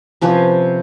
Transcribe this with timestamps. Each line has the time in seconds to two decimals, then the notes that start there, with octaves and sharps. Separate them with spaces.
0.21 C3 F3 C#4 B4